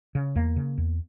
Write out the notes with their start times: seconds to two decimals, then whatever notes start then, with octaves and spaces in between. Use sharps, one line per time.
0.15 C#3
0.36 E2 A#3
0.56 C#3
0.78 E2